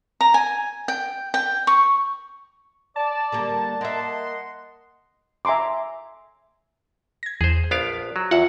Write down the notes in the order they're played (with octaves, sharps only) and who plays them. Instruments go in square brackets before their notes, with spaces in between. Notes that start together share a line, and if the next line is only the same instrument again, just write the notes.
[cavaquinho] A#5
G#5
G5
G5
C#6
[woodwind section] D5 [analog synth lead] A5
[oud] D3 G3 A#3
[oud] A#3 E5 [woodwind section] D#5 F#5 C6
[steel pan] E5 G#5 A#5 C6 D6
[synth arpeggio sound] G#6 A#6
[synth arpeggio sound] E2 [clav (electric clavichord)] G#4 C5
[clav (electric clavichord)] A#1 B3 F5 [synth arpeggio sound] B6 D7
[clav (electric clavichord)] F#3
[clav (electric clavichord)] E2 F#5 [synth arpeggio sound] F4 E5